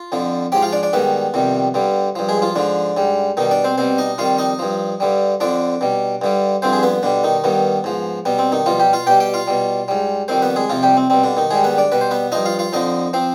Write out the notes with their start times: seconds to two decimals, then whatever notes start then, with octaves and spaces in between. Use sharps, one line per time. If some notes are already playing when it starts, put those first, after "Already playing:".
Already playing: F4
0.12 F2 D3 F3
0.52 G#2 F3 G4 G5
0.62 F4 F5
0.73 D4 D5
0.83 D4 D5
0.93 G#2 D#3 G3 B3 B4
1.34 F2 C3 D#3 G3
1.74 G2 D3 G3
2.16 G2 F3
2.29 G#3 G#4
2.42 F3 F4
2.56 G#2 D3 F3 D4
2.97 G#2 G3
3.37 B2 D#3 G3 D#4
3.51 D4 D5
3.64 C4 C5
3.78 B2 G3 C4 C5
3.98 D#4 D#5
4.18 F2 D#3 G3 F4 F5
4.38 D#4 D#5
4.59 G2 F3
5.00 G2 D3 G3
5.40 F2 D3 F3 D4 D5
5.81 B2 G3
6.21 G2 D3 G3
6.62 G2 D3 F3 C4 C5
6.73 G#4
6.83 B3 B4
7.03 B2 D3 G3 D4
7.24 D#3 D#4
7.44 G2 D#3 G3 B3
7.84 G#2 F3
8.25 B2 G3 B3
8.39 C4
8.52 D#3 D#4
8.66 B2 F3 G3 F4
8.80 G3 G4
8.93 F4 F5
9.06 B2 G3 G4 G5
9.20 G4 G5
9.34 F4 F5
9.47 B2 G3
9.88 G#2 G3
10.28 F2 D#3 G3 C4 C5
10.42 B3 B4
10.56 G#3 G#4
10.70 F2 C3 F3 F4
10.83 G3 G4
10.97 C4
11.10 B2 G3 C4
11.24 D3 D4
11.37 D#3 D#4
11.51 G#2 D#3 G3 G#3 G#4
11.64 B3 B4
11.78 D4 D5
11.92 B2 G3 B4
12.01 C5
12.11 B3 B4
12.32 G2 F3 D#4 D#5
12.45 F4 F5
12.59 F4 F5
12.73 F2 D3 F3 D#4 D#5
13.13 F3 C4 C5